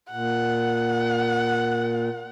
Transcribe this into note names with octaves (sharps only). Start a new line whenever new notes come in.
A#2 F#5